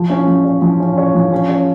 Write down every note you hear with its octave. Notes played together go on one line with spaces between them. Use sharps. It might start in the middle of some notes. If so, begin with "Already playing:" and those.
Already playing: F3
C#4
F3
C#5
F3
C#4
C#5
F3
C#4
C#5